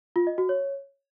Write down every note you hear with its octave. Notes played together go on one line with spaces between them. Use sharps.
F4
D#5
F#4
C#5